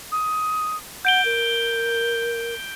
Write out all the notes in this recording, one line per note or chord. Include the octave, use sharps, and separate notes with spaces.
D#6
F#5 G6 D7 G7
A#4